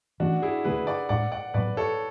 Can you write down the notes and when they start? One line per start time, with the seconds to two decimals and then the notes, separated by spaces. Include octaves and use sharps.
0.20 E3 A3 C#4 D4 F#4
0.42 E4 G#4
0.64 D3 A3 D4 G#4 B4
0.87 D5 F#5
1.09 A2 G#3 D4 D5 F#5
1.32 D5 F#5
1.54 A2 F#3 B3 B4 D5
1.77 A4 C#5